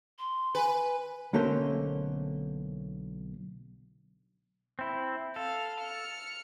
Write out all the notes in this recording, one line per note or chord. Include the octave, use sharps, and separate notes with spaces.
C6
B4 G#5
B1 D3 A3 A#3 C#4 C5
C4 E4
A4 F5
F6 C#7